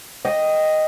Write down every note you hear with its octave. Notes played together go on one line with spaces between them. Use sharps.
D#5 G5